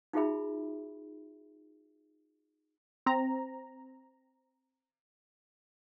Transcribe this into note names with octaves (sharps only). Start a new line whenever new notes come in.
D#4 F4 F#4 G#4 E5 B5
C4 A#5